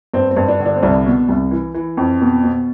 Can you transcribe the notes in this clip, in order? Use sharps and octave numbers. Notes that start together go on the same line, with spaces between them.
G2 C4
C4
G2
D4
D3
D4
C4
C2 D4
B2
C2
E3
E3
F2
B2
B2